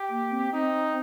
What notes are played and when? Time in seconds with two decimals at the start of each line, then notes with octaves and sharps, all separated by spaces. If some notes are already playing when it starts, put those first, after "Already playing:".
Already playing: G4
0.10 A#3
0.32 C4
0.53 C4 D#4